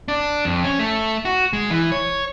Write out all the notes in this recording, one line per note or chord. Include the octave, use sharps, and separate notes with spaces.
D4
F2
C#4
A3
F#4
G#3
E3
C#5